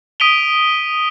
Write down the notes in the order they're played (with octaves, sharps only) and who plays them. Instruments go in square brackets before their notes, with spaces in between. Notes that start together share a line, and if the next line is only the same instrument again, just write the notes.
[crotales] D#6 B6 D7 D#7 F7 G7